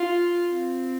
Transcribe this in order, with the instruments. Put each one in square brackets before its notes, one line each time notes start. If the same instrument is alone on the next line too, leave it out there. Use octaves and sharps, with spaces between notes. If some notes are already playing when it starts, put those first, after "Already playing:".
Already playing: [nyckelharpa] F4
C4